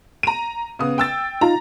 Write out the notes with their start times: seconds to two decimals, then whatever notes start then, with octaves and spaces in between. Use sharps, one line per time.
0.23 A#5 D#7
0.79 C#3 B3 D#6
0.98 G5 E6 A6
1.41 D#4 F4 A#5